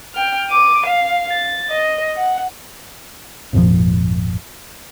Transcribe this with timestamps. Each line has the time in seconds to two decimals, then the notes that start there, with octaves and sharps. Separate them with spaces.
0.15 G5 F6
0.49 D6 D#7
0.86 F5
1.31 A6
1.70 D#5
2.16 F#5
3.53 G#1 F2 A#2 F3